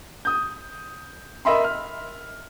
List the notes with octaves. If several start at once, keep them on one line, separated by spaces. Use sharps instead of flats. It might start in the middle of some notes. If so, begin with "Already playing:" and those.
D#6 G6
A#4 D#5 E5 B5 C6
F6